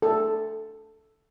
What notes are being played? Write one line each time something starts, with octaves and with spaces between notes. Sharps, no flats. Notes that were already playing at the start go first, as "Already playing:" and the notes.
A4